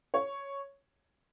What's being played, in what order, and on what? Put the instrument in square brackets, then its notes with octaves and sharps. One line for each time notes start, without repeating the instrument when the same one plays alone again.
[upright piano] C#5